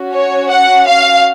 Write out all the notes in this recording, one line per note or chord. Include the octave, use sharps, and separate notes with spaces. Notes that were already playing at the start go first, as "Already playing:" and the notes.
Already playing: C#4 F#4
C#5
F#5
F5